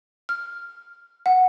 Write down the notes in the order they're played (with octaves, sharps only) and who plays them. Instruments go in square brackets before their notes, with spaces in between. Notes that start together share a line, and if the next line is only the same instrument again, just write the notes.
[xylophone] F6
F#5